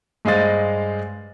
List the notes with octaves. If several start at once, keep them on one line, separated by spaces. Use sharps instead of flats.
G2 G#3 C5 D#5 F5 A6